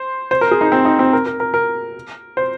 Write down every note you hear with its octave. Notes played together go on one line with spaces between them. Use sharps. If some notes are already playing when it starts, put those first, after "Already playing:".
Already playing: C5
C5
A#4
G#4
D#4
C4
D#4
C4
A#4
A#4
A#4
A#4
C5